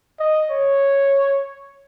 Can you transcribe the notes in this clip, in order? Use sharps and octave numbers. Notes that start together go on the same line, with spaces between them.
D#5
C#5